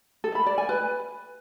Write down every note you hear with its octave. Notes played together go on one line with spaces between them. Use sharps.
A4
B5
D5
G#5
B4